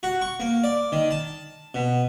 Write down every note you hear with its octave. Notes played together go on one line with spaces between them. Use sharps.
F#4
C#6
A#3
D5
D#3
A5
B2